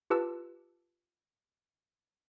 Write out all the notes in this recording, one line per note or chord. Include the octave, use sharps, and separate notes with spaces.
F4 G4 B4 A5 E6